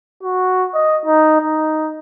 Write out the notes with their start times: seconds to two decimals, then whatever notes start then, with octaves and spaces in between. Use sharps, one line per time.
0.22 F#4
0.74 D#5
1.05 D#4
1.41 D#4